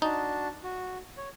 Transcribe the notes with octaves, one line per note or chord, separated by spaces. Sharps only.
D4 D#4 F#4 A5
F#4
C#5